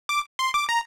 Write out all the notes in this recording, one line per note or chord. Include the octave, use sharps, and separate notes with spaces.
D6
C6
D6
A#5